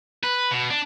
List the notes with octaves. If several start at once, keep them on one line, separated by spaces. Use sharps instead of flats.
B4
B2
D4